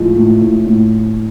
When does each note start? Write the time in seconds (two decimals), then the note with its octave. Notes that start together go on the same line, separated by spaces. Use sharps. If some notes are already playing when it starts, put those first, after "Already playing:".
Already playing: A2 F3 G#3
0.16 A2
0.41 A2
0.67 A2